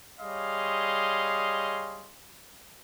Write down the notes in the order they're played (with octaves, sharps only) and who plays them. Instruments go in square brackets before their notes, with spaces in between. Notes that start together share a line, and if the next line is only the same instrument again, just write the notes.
[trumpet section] G3 G#4 C#5 D#5 F5 C6